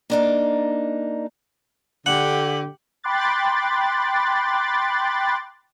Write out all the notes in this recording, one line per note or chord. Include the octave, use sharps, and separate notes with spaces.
A#3 D4 D#4
D3 G4 F#5
G5 B5 C6 D6 F#6 A6